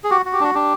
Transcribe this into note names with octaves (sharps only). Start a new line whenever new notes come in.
G#4
F#4 G4
F#4
G4
D4 F#4
D4 G4